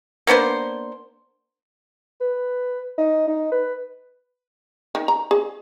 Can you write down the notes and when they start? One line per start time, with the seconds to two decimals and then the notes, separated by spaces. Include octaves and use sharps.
0.27 A#3 B3 D4 C5
2.21 B4
2.98 D#4
3.28 D#4
3.52 B4
4.95 D#3
5.08 A#5
5.31 G#4